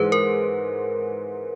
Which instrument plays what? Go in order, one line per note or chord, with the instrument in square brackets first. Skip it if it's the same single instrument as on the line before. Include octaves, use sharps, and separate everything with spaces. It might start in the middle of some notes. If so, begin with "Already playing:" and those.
Already playing: [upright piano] G#2 E3 G#3 [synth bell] B4 C5
[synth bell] A#4